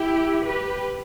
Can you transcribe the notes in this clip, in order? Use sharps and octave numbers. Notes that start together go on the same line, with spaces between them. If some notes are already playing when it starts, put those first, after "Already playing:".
Already playing: E4 G4
G4 B4